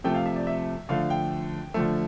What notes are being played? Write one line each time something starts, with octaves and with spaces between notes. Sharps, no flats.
C3 F3 A3 G5
F5
E5
D5
E5
D3 F3 A3 F5
G5
D3 F3 A3